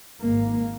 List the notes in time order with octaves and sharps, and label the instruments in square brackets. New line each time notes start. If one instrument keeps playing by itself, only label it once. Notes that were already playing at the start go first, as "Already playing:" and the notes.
[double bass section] G#1 G#2 A#3